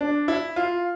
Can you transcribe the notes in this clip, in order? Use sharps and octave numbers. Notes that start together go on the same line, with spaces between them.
D4
E4
F4